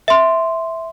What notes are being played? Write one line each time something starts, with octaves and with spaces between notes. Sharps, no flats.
E5 C6